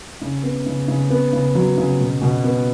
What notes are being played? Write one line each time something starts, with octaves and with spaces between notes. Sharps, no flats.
C#3
B3
C#3
C#3
B3
C#3
F#3
C#3
B2
B2
B3